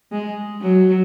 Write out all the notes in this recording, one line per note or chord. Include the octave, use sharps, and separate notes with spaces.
G#3
F#3